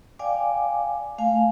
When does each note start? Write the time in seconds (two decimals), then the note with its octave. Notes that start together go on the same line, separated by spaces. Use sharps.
0.19 D5 F5 G5 G#5 D6
1.18 A3 F5 G#5